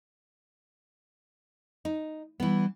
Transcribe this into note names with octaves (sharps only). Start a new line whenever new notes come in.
D#4
E3 G3 B3